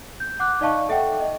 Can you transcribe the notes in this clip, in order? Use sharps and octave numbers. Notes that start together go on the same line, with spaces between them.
G6
F#5 D6 F#6
D#4 D5 D#5 F5 A5 C#6
A4 E5 F#5 G5
D#5